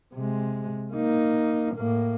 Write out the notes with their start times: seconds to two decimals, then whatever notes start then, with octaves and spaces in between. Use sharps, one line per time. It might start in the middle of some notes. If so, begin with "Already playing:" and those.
0.14 C3 G#3
0.93 A#3 D#4
1.76 A2 A#3